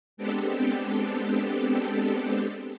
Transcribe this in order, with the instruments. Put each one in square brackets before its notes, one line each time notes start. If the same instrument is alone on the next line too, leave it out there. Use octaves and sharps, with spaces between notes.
[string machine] G#3 B3 C4 D4 G4 A4